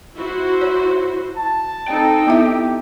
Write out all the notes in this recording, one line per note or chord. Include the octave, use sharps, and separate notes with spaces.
E4 F#4 C5
C#5
A5
C4 D#4 A4 G5
B3 E4 G4 E5